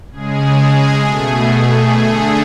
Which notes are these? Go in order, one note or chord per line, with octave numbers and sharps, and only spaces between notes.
C#3 G#3 G#4
B2 A3
D3 A3 G#4